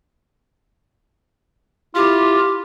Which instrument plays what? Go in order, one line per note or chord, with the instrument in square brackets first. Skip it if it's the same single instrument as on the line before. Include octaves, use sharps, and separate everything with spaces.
[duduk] E4 [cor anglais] F4 [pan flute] G4